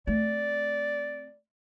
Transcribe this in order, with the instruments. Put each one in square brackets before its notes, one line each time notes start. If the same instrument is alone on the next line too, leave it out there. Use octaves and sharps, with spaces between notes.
[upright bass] A3 C4 [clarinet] D5